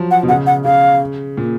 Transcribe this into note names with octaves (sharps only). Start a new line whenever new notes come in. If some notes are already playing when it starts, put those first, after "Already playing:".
Already playing: F3 F#3
F#5
B2
C#3 F#5
F#5
C#3 F5
A#2